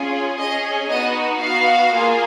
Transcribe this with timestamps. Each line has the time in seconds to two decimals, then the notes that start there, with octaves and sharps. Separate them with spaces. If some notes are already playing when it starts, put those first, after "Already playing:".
Already playing: C#4 F4 G#4
0.38 C#4 G#4 D#5
0.90 B3 D#4 F#4 D#5
1.42 B3 F#4 F5
1.94 A#3 F4 G#4